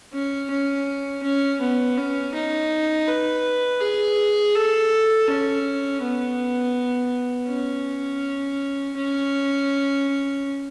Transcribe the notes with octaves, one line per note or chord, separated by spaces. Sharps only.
C#4
C#4
C#4
B3
C#4
D#4
B4
G#4
A4
C#4
B3
C#4
C#4